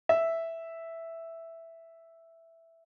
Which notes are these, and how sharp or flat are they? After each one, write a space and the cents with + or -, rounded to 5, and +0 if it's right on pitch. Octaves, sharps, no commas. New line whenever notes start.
E5 +0